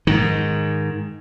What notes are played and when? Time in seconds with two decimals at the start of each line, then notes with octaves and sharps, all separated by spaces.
0.07 G#2 D#3